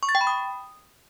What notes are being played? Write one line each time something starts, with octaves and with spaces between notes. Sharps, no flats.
C#6
A6
G5
B5
D#6